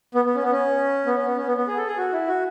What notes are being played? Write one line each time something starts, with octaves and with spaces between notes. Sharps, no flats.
B3
B3
C#4
B3
C#4
B3
C#4
B3
C#4
B3
B3
G#4
A4
G#4
F#4
E4
F#4